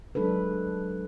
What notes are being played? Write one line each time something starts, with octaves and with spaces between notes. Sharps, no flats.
F#3 G#3 D4 A4 B4